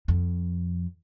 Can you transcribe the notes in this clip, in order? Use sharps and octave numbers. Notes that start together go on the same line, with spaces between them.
F2